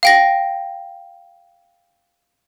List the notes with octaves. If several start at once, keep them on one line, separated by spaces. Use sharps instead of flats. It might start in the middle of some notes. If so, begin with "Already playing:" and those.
F5 G5 A#6